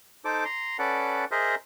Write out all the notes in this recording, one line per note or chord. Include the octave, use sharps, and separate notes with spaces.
D#4 A4 C5 D6
A#5 C6
C#4 A4 B4 D5 F#5
G#4 A#4 C5 D#5 E5